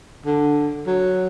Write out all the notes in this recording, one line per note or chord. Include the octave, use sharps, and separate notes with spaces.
D3
F#3